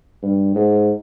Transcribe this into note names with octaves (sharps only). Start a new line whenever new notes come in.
G2
G#2